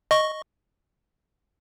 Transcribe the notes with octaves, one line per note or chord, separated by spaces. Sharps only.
D#5 C#6